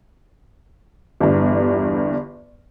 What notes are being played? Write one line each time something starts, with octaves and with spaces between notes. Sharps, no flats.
G1 E2 G2